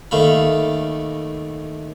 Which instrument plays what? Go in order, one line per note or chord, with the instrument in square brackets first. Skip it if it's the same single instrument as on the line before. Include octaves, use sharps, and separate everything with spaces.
[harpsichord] D#2 A3 F5 B5